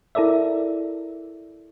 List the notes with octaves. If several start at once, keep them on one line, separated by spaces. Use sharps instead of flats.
E4 A4 A#4 D5 E5